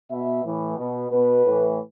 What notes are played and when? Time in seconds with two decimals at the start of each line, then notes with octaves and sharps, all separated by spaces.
0.10 B2 E5
0.44 A2 E3
0.78 B2
1.11 B2 B4
1.45 A2 E3